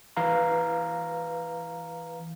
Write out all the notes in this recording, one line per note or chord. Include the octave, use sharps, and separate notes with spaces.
E3 B4 F5 A#5